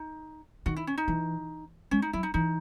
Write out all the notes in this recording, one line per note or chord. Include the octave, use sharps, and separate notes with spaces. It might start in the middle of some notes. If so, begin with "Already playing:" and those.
Already playing: D#4
D#3 F#4
E4
C#4
D#4
E3
G#3 C#4
D#4
F#3 E4
D#4
E3 D#4